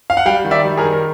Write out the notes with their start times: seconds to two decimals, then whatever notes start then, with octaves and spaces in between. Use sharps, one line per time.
0.10 F5
0.17 F#5
0.26 G3 F5 G5
0.44 D#3
0.51 D5 E5
0.65 G3
0.77 G#4 A#4
0.84 D#3
0.93 A#4